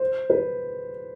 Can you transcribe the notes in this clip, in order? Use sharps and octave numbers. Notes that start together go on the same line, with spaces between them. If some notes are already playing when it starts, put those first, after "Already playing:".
Already playing: C5
B4